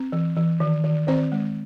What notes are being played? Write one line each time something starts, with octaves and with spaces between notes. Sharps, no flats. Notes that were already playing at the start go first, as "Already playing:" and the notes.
Already playing: C4
E3
E3
D#3
D#3
D#3 C4 C5
G#3